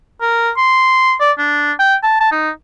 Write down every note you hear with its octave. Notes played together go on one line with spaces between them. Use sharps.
A#4
C6
D5
D4
G5
A5
A5
D#4